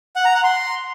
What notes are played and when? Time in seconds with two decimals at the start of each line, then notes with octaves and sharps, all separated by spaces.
0.16 F#5
0.25 A#5
0.34 F#5
0.44 C6